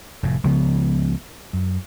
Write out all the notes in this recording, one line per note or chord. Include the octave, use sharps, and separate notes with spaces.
F1 A2
C#2 C#3 F3 B3
F#2